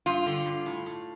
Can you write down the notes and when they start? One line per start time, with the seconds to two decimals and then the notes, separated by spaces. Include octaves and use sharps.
0.06 G2 F4
0.26 D3
0.46 G2
0.66 A2
0.86 A2